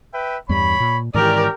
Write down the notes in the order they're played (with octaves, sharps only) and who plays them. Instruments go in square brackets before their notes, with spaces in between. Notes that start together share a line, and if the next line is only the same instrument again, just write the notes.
[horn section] B4 E5 G5
[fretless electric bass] E2 G2 G3 [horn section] C#5 B5
[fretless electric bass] A#2
[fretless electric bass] G#2 D#3 E3 [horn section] C#4 D5 [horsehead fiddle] G4 A#4